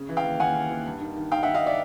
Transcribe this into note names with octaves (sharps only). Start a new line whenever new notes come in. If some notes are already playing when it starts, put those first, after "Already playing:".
Already playing: C#3
E3
F5 G5
D#2
D#2 F#5 G#5
D#2
D#2
G2
D#3
D#3
D#3 F5 G5
E5 F#5
D#3
D#5 F5
D5 E5